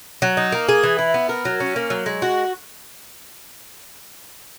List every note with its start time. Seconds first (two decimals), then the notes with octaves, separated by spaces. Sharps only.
0.22 F#3
0.37 D#4
0.52 A#3
0.69 G#4
0.83 E3
0.99 E4
1.14 B3
1.29 A#4
1.45 F#3
1.60 C#4
1.76 A#3
1.90 F#3
2.06 G#3
2.22 F#4